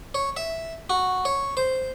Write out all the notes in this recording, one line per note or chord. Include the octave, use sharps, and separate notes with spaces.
C#5
E5
F#4
C#5
C5